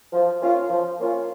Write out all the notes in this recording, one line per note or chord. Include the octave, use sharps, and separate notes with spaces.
F3
A#3 C#4 F4
F3
A#3 C#4 F4